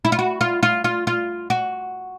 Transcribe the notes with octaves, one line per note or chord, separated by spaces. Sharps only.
E4
F4
F#4
F4
F4
F4
F4
F#4